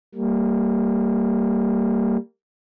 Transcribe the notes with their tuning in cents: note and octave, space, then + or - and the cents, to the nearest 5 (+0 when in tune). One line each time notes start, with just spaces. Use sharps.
G3 +0 A#3 -20